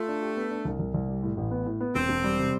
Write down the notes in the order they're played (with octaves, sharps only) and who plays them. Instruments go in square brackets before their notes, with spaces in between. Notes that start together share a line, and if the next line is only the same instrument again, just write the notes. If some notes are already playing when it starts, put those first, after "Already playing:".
Already playing: [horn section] A3 [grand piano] F4
[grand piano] D4
G4
B3
D4
C2
C2
C2
G3
A2
A1
B3
A2
B3
[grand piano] E1 [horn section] C4
[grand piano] E1
G3
C3